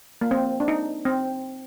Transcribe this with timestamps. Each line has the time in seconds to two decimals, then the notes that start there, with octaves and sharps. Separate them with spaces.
0.21 A#3
0.31 C4
0.60 D4
0.68 D#4
1.05 C4